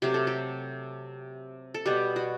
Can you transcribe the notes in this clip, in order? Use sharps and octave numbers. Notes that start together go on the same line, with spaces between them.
C3 F#3 A3 G4
A4
G4
A4
B2 G3 B3 G4
F#4